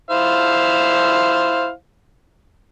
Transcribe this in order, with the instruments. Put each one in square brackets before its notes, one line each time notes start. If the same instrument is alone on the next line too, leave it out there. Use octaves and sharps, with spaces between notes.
[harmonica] E4 C5 F5